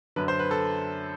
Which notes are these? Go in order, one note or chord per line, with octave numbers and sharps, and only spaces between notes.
F#2 D3 B4
C5
B4
A4